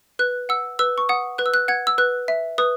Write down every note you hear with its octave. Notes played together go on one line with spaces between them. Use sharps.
B4 F#6
F#5 E6
B4 E6
C#6
F#5 D#6
B4 F#6
E6
F#6
F#5 G#6
E6
B4 F#6
E5
B4 D#6